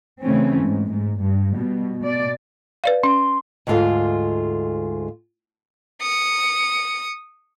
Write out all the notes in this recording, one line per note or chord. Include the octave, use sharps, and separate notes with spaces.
C#3 E3 A3 C4 C#4
G#2
G#2
G2
B2 G3
B2 D5
B4 D5 F5
C#4 C6
D2 G#2 G#3 F4 A4 F5
D#6 C#7